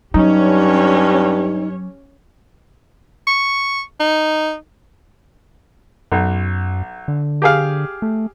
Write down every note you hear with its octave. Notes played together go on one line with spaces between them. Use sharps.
G2 F#3 C#4 D#4 G4 C#5
C#6
D#4
B1 F#2
D3
G4 G#4 F5
A3